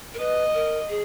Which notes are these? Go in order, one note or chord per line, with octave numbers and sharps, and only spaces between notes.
A#4
B4 D#5
A#4
G#4